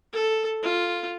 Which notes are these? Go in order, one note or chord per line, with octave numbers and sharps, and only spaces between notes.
A4
F4